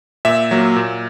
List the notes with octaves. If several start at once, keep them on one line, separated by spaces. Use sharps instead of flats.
A#2 E5
F#3 A#3
A#2